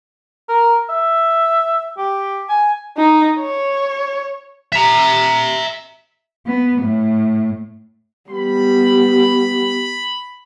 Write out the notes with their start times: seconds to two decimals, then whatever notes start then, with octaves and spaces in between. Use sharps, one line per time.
0.49 A#4
0.90 E5
1.98 G4
2.49 G#5
2.97 D#4
3.39 C#5
4.72 E5 A#5
6.46 B3
6.81 A2
8.31 G3 B3 B5